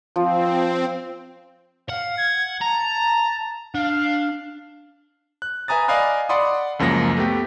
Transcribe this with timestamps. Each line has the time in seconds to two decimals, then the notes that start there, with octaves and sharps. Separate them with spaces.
0.16 F3 C4
1.89 F5 F#5
2.18 G#6
2.61 A5 A#5
3.75 D4 F5
5.42 F#6
5.68 B4 E5 G#5 A#5 D#6 A6
5.88 D5 D#5 F5 G#5 B5 F#6
6.29 D5 F#5 B5 C6 D#6
6.79 C#2 F#2 F3 A#3 A#6
7.17 A3 B3 G4